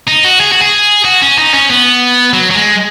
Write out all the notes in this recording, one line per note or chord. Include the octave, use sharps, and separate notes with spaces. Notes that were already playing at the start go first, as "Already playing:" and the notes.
D#4
F#4
G#4
F#4
G#4
F#4
C#4
D#4
C#4
B3
F#3
F#3
G#3